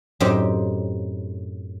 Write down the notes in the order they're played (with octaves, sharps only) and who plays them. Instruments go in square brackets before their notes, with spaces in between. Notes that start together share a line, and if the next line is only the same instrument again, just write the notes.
[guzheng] F#2 A2 C4 D#4 G4